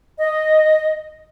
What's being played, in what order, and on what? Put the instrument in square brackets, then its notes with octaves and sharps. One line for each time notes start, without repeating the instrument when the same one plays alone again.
[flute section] D#5